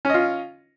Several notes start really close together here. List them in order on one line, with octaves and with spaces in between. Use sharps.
C#4 D#5 F4